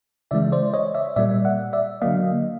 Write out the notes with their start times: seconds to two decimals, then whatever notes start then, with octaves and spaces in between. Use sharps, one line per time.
0.31 C#3 E3 G#3 D5 E5
0.52 C5 D5
0.74 C#5 D#5
0.94 D5 E5
1.16 A#2 G3 A#3 D5 E5
1.45 E5 F#5
1.73 D5 E5
2.02 D3 F#3 A#3 D#5 F5